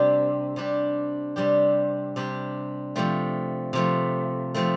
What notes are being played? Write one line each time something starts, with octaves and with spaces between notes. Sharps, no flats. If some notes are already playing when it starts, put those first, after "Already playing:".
Already playing: C3 G3 D4 G4
C3 G3 D4 G4
C3 G3 D4 G4
C3 G3 D4 G4
C3 F3 A3 C4
C3 F3 A3 C4
C3 F3 A3 C4